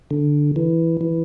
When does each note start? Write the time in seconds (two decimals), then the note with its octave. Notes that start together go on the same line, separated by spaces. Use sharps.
0.11 D3
0.56 E3
1.01 E3